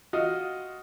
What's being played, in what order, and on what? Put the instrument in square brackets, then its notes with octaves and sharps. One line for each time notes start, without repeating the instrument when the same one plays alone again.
[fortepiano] F4 F#4 D#5 F5